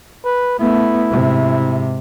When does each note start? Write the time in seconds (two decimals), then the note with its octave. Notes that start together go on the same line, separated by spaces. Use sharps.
0.25 B4
0.60 A3 B3 E4
1.10 G#2 C3